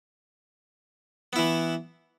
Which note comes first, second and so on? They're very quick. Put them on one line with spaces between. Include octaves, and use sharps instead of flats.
B3 E4 E3